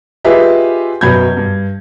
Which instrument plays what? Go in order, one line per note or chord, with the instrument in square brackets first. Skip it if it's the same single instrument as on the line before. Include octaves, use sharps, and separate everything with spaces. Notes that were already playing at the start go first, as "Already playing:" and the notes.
[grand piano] F4 G4 G#4 B4 D#5 E5
F#2 B2 F#3 B5 G6 G#6
G2